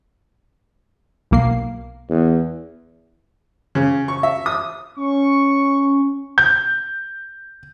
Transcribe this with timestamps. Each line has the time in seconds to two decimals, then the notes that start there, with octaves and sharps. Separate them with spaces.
1.31 B1 A#3 C7
2.10 E2
3.75 C#3
4.08 C#6
4.23 E5
4.46 D#6
4.97 C#4 C#6
6.38 G6